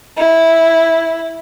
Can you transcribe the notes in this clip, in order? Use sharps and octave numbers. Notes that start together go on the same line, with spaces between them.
E4